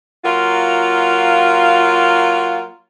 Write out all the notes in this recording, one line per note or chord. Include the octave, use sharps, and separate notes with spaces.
F#3 A#3 F4